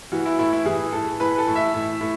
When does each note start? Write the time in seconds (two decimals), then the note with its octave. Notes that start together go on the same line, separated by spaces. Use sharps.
0.12 E3 F#4
0.25 E4
0.39 A2 E4
0.53 E4
0.66 E3 G#4
0.92 E3 A4
1.20 E3 B4
1.38 A4
1.47 A2
1.56 E5
1.74 A2
2.01 A2